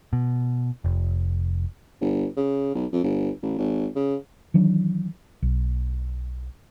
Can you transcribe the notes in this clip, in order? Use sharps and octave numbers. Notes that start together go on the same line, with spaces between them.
B2
F1
G1
C#3
B1
F2
G1
A1
G#1
C#3
D#3 E3 F#3 D4
B1